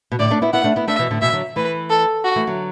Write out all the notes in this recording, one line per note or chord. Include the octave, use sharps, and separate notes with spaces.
B2
A2 D3 D5
A3 D4
B3 E4
B3 E4 F#5
A3 D4
B3 E4
A3 D4 E5
B2 E3
A2 D3
B2 E3 E5
D3 F#3
E3 A3 B4
A4
F#4
E3 A3
D3 F#3